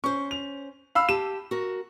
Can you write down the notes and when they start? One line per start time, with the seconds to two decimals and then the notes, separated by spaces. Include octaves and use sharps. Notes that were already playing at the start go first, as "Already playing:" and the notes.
0.04 C#4 C5 C#6
0.31 F7
0.95 F5 B5 E6
1.09 G4 A5 E7
1.51 F#4 A#4